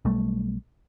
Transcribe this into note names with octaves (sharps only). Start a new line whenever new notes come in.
B1 G3 A3